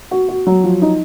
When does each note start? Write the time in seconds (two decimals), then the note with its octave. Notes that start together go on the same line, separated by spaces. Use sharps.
0.11 F#4
0.28 F#4
0.47 F#3
0.64 F3
0.82 D#4